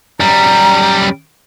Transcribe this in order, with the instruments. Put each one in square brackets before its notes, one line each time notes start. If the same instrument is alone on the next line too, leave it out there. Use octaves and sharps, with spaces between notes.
[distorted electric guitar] F#2 G3 [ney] A#5